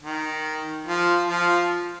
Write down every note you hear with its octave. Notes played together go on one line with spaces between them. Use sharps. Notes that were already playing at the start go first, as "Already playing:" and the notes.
D#3
F3
F3